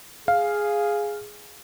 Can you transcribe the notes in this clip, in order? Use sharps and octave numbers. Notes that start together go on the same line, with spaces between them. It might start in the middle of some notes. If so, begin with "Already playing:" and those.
G#4 F5